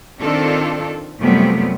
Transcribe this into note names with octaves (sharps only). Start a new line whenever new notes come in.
D#3 C4 D4 F4 A4
F#2 C3 F3 G3 A3 B3